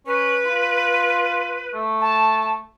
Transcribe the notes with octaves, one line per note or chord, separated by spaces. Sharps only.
C#4 B4
F4
A3
A5